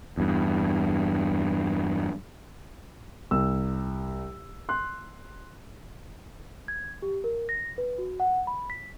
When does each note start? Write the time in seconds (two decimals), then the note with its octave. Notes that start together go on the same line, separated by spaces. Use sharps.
0.17 E2 G2
3.31 C2 E6
4.69 C6 F#6
6.68 G#6
7.02 G4
7.24 A#4
7.49 A#6
7.78 B4
7.98 F#4
8.20 F#5
8.47 B5
8.70 B6